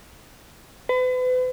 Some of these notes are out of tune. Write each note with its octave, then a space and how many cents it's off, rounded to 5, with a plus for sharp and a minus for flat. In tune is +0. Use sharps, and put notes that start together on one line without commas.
B4 +40